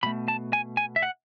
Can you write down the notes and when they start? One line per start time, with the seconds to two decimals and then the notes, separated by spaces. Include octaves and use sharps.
0.03 B2 A3 B5
0.28 A5
0.53 G#5
0.77 G#5
0.96 E5
1.03 F#5